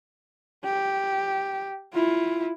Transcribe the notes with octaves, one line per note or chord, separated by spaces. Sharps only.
G4
E4 F4